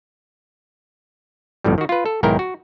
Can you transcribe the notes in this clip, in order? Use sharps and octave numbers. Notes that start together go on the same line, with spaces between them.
G1 F2 A2 G3
D#3 F#4
F4 B4
A4
B1 G#2 D#3 E4 A#4 G5
F#4